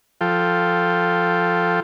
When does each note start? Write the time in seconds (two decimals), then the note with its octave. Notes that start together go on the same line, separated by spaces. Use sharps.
0.21 F3 F4 A4 G5